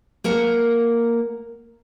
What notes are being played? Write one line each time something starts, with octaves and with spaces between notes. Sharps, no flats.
A#3 A#4 F#5 A#5